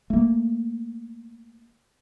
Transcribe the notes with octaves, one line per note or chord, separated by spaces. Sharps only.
A3 A#3